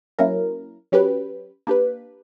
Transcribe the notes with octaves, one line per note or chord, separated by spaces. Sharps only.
F#3 A#3 C#4 E4 A#4
F#3 C#4 G4 B4
A#3 D4 G4 B4